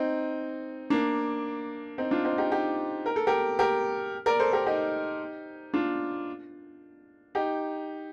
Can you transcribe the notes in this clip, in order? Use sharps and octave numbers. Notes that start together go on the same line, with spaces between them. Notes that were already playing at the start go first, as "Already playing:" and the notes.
Already playing: C4 D#4
A#3 D4
C4 D#4
D4 F4
C4 D#4
D#4 G4
D#4 G4
A#4
A4
G4 A#4
G4 A#4
A#4 D5
A4 C5
G4 A#4
D#4 G4
D4 F4
D#4 G4